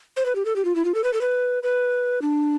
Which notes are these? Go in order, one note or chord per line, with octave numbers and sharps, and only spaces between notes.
C5
B4
G4
A4
G4
F4
E4
F4
A4
B4
A4
B4
B4
D4